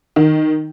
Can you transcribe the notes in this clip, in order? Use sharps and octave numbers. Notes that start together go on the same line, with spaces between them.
D#3